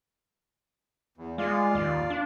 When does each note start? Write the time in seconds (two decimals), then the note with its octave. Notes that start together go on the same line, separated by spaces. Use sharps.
1.17 E2
1.38 G#3 F4 D5 F5
1.75 D#2
2.10 D4